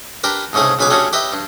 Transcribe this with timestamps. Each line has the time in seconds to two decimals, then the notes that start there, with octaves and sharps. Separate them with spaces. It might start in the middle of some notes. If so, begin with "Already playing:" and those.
0.24 D4 G4 A#4 B4
0.53 C2 G#2 C#3 A3 G#4
0.79 B1 C#3 B4 G#5 D6
0.90 G3 A3 C#4 D4 F#4 G#4
1.13 G4 B4 D#5 E5 G5
1.33 G2